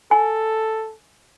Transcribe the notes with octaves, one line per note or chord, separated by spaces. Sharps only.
A4 G#5